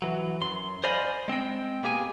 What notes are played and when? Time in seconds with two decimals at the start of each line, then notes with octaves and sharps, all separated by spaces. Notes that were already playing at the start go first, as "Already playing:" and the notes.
0.02 E3 F#3
0.41 F#2 C6
0.84 C5 D5 D#5 F5 G#5 B5
1.28 G#3 C4 D#5 G5
1.83 B2 A#3 G4 G#4 G#5